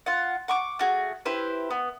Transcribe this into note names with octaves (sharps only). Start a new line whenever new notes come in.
F4 F#5
F#5 C#6 D6
A3 F#4 G#4
E4 G4 B4 C5
B3